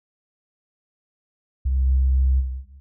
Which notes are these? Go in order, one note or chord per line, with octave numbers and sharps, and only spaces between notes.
C2